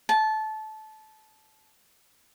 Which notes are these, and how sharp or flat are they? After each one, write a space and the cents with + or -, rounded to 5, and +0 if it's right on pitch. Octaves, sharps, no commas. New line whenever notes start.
A5 -20